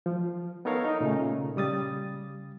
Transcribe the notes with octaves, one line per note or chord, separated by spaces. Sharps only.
F3
B3 D#4 A4 A#4 C#5 F5
D#4
A#2 C#3 A3
C#3 G3 D#6 A6